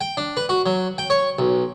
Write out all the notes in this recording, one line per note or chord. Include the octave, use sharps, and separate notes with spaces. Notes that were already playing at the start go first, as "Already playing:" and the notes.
G5
D4
B4
F#4
F#3
G5
C#5
B1